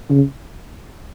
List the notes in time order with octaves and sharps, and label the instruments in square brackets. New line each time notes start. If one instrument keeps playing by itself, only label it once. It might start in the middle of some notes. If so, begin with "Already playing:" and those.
[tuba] C#3